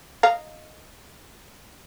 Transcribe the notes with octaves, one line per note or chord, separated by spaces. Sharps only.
D#5 F5 A#5